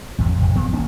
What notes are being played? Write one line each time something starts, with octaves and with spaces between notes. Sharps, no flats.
A1 F2 A2 C3
E1
G1 F3 B3 C4
G#1 A#3 C#4 D4